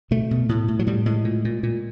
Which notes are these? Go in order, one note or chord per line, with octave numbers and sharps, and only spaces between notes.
B2 A3
B2
A2
A2
F#3
A2 G3
A2 G#3
A#2
A#2
A#2